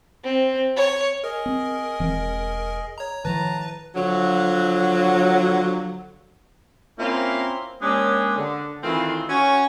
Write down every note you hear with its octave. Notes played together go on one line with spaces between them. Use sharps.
C4
C#5
G#4 A#4 D#5
C4
E1 E3 C4
C#5 A#5
A2 D#3 F3 B4 A5 A#5
D3 F3 F#3
A#3 C4 C#4 E4 F4 A#4
G#3 A#3 C#4 D4 G4 G#4
D3
D#3 E3 A3 C4 F4
C#4 F#4 C#5